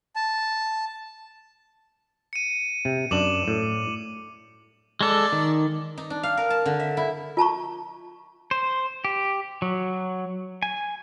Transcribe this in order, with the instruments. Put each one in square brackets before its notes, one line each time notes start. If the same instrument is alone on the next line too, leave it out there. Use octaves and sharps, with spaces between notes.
[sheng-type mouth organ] A5
[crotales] C#7 D#7
[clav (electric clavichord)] C3
[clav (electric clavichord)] F#2 D4 [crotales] D6 E7 F#7
[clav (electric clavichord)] A2
[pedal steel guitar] G#3 A4 [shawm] D5
[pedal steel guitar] D#3
[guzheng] D#4
D4
F5
A#4
A5
D3
E5
E4
[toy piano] F4 A5 A#5 C#6
[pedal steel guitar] C5
G4
F#3
G#5